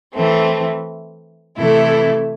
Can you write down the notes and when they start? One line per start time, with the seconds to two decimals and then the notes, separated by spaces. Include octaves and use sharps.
0.13 E3 A3 C4
1.58 C3 E3 A3 E4 A4